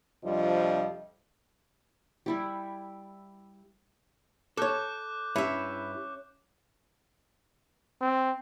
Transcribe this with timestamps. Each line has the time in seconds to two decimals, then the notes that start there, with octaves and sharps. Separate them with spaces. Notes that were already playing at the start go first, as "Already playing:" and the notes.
0.24 F2 C3 F3 G3 D4 D#5
2.26 G3 E4 G4
4.57 A4 C#5 D6 F#6 G6
5.36 G2 C#4 E4 E5
8.01 C4